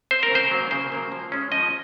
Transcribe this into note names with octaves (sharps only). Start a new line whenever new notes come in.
C4 C5
A#4
C#3 C5
F#3 A#3
C#3 C5
F#3 A#3
F3
G#3 C#4
F3 D#5